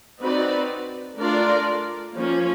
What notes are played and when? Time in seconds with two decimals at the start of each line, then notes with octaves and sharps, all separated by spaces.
0.21 C4 D#4 F#4 B4 D5
1.18 A3 D4 F4 A#4 D5
2.14 F3 A#3 C#4